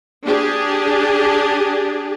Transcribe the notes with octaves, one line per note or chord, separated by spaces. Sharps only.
D4 G4 G#4